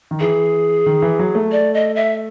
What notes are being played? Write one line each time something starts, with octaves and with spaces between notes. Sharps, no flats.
D#3
E3 G#4
D#3
E3
F#3
A3
D5
D#5
E5